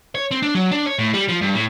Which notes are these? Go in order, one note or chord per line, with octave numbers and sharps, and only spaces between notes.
C#5
C4
D4
F#3
D4
C#5
A2
G3
F3
G2
A2